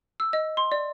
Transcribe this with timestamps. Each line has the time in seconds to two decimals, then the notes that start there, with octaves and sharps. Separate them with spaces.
0.20 E6
0.33 D#5
0.57 C6
0.72 D5